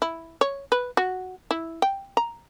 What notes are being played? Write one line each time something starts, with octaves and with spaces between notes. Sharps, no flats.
E4
C#5
B4
F#4
E4
G5
A#5